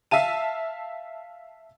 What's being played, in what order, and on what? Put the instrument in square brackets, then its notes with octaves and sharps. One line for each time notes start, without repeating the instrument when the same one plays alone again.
[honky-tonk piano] E5 F5 A5 D#7